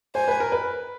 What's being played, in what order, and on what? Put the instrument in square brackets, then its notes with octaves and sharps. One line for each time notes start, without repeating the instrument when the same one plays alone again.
[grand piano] C5 [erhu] G#5
[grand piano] B4
A#4
B4